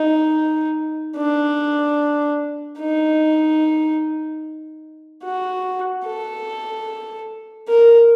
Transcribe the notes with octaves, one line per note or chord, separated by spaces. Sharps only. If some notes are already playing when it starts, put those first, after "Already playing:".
Already playing: D#4
D4
D#4
F#4
A4
A#4